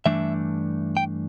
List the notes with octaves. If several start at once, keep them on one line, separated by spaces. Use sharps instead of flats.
G2 E3 A3 D4 E5
G5